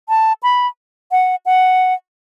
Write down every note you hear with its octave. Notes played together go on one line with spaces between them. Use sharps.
A5
B5
F#5
F#5